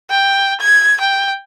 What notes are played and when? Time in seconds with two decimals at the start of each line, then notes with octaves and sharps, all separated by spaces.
0.11 G5
0.61 G#6
1.01 G5